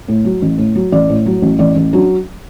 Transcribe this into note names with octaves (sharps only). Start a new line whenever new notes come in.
A2
F#3
A1
A2
F#3
A1 D5
A2
F#3
A1
A1 D5
A1
F#3 D4